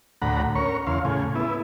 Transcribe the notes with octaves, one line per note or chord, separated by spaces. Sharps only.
D2 A2 F#5 A#5 B5
C#4 A#4 C#5 C#6
E2 C#3 F5 C6
A2 C#3 G#4
B3 E4